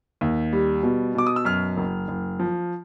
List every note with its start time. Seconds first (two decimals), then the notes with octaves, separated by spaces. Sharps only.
0.21 D#2
0.53 G3
0.83 B2
1.15 B2 D6
1.27 D#6
1.36 E6
1.45 F#2 F6
1.77 F#1
2.08 F#1
2.40 F3